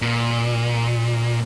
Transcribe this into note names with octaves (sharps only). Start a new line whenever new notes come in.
A#2